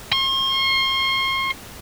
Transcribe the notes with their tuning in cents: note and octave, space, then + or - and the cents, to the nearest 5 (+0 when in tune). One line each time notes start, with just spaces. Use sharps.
C6 +45